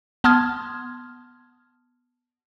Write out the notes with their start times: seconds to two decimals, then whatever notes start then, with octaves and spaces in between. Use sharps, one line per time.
0.24 B3 A5 C6 D#6 F6 G#6